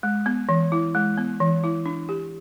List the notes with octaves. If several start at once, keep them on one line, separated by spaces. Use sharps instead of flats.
G#3
B3
E3
E4
G#3
B3
E3
E4
D4
G4